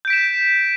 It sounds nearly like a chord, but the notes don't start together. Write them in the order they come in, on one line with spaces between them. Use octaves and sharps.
G6 D7 B6 E7